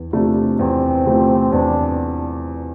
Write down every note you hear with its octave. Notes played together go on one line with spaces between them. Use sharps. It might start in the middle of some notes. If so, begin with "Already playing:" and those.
Already playing: E2
C3 F3 A3 D4
E2 C4
C3 F3 A3
E2 D4